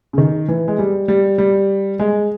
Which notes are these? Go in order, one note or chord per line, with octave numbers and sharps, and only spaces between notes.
C#3
D#3
E3
G#3
G3
G3
G3
G#3